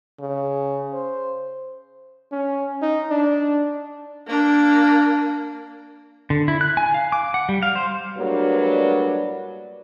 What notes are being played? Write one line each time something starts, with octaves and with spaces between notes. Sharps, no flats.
C#3
C5
C#4
D#4
D4
A#3 D4
D3
E4
F#6
G#5
F5
D6
F#5
G3
F5
C5
A2 F#3 G3 A#3 D4 B4